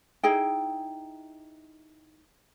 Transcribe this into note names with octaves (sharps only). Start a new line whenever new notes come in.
D#4 E4 G#4 G5